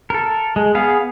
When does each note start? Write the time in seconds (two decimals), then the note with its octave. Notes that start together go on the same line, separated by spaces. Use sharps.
0.10 A4 A#4
0.56 G#3
0.75 B3 G#4 F5